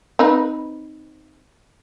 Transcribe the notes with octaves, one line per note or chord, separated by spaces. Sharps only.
C4 D#4 B4